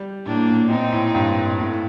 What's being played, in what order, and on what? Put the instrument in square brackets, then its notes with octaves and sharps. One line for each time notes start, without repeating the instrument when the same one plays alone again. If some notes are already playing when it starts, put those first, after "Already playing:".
Already playing: [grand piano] G3
[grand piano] A2 [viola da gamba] A#3 D4
[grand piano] A#2
[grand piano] A#2 [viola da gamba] C4 D#4
[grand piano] A2
G2
[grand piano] A2 [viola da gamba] A3